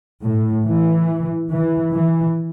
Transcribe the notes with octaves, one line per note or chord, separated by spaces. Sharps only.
A2
E3
E3
E3